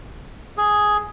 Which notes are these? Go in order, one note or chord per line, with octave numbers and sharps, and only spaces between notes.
G#4